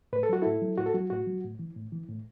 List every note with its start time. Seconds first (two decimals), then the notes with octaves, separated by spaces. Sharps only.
0.13 A2 B4
0.23 A4
0.29 F#3 F#4
0.42 A2 E4 A4
0.62 F#3
0.78 A2 F#4
0.86 A4
0.94 F#3 F#4
1.10 A2 F#4
1.27 F#3
1.44 A2
1.59 E3
1.76 A2
1.92 E3
2.08 A2